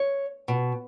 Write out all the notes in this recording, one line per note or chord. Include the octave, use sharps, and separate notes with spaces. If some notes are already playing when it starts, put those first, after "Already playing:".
Already playing: C#5
B2